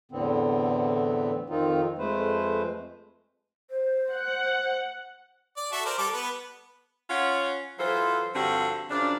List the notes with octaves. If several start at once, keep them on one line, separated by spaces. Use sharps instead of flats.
E2 A2 D3 B3 C4
F2 D#3 C4 D#4 F4
F2 G#3 A3 B4 C5
C5
F#5
D5
F#4 A4 E5
A#4 C5 D5
G3 A4 D6
B3 B4
C#4 F4 C#5 F#5
E3 F#3 F4 A4 C5
G2 D3 F3 C4 F#4 G4
F#2 C#3 F3 D4